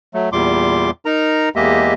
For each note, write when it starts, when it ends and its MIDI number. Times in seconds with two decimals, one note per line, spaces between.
0.14 0.29 54
0.14 0.29 57
0.32 0.90 40
0.32 0.90 46
0.32 0.90 55
0.32 0.90 84
0.32 0.90 86
1.05 1.49 63
1.05 1.49 70
1.05 1.49 82
1.56 1.94 40
1.56 1.94 56
1.56 1.94 58
1.56 1.94 67
1.56 1.94 75
1.56 1.94 76